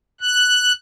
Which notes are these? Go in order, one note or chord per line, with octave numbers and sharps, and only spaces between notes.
F#6